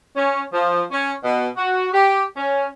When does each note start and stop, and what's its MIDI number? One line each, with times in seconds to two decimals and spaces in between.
0.16 0.41 61
0.52 0.82 53
0.91 1.11 61
1.24 1.47 47
1.57 1.88 66
1.93 2.22 67
2.36 2.66 61